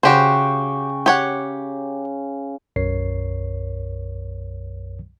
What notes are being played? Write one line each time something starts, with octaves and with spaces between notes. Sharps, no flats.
C#3 F#4 G4 C5 G5 C#6
G4 C#5 F#5
B1 F#2 A#4 C#5 C7